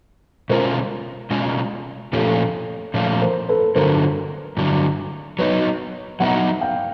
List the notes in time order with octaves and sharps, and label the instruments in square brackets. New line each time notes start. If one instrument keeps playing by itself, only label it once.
[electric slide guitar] B2 G#3 C#4 F4 [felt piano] A#4 C5
[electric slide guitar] B2 G#3 C#4 F4
[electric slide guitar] A#2 F3 A3 C#4 F4 [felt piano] G4 A4
[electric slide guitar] A#2 F3 A3 C#4 F4
[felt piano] A#4 C5
A4 B4
[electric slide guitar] G2 D3 F#3 [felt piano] A#4 C5
[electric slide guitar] G2 D3 F#3
[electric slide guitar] F#3 B3 D#4 [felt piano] B4 C#5
[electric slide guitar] F#3 B3 D#4 [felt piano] E5 F#5
[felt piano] F5 G5